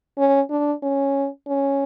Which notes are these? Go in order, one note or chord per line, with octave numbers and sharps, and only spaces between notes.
C#4
D4
C#4
C#4